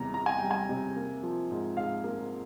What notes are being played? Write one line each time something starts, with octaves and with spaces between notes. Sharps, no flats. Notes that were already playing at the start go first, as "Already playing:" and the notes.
Already playing: E2 C3 G3 A#5
E2 A#5
G#5
G3 G5
G#5
C3
A#3
F3
G#2
G#2 F5
A#3